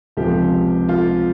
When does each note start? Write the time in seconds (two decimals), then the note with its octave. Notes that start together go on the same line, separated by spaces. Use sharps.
0.17 C#2 C3 F3 G4
0.89 F4